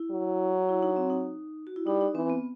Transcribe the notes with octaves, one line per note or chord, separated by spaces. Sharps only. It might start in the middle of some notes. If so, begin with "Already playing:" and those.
Already playing: E4
F#3
E4
D#4
C4
D#4
F#4
E4
G3 D#4
D#4
E3 C4
B3